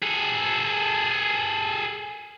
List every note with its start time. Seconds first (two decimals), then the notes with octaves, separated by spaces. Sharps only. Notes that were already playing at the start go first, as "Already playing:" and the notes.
0.03 G#4 A4